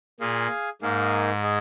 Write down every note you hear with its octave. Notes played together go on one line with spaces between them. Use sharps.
A#2 G#4 F5 G#5
G#2 A#3 D#4 A#4 F5 G#5
G#4 D#5 G#5